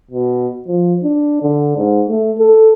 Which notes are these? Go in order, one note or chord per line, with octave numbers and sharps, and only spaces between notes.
B2
F3
D4
D3
G#2
A3
A4